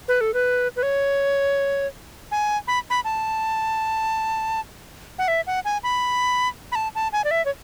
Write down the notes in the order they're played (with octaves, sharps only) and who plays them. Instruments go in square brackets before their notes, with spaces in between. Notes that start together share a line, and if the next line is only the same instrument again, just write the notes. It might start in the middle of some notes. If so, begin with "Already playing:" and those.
[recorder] B4
A4
B4
B4
C#5
G#5
B5
B5
A5
F#5
E5
F#5
G#5
B5
B5
A5
A5
G#5
D5
E5
C#5